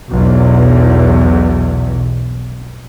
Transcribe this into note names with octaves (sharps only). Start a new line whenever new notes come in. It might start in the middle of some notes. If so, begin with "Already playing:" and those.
B1 E2